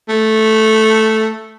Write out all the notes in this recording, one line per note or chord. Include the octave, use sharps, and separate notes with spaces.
A3